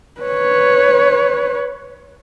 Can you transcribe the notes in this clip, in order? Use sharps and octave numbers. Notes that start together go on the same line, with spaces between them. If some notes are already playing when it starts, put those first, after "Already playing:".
B4 C#5